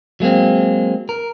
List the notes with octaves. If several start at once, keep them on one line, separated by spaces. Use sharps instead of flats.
F#3 G#3 A#3 C4
A#4